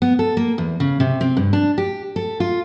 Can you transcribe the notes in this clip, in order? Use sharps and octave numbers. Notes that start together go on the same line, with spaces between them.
B3
A4
A#3
E2
C#3
C3
C4
G2
D4
G4
A4
F4